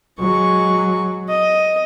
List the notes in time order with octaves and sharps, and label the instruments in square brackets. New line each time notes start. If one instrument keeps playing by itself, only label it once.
[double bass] F#3 [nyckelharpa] G#3 C#6
[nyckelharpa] D#5